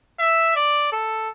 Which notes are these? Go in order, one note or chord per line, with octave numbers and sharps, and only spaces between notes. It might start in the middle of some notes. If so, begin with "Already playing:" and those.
E5
D5
A4